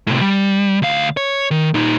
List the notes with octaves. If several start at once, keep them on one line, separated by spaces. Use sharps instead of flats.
A2 C3
G3
D2 F5
C#5
D#3
A#2 D#4